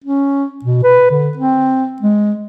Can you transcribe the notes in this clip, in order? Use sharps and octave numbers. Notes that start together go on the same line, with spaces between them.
C#4
B2
B4
D3
C4
G#3